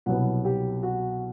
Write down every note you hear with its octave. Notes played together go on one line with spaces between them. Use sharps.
C2 B2 F#3 B3 F#5
G4
F#4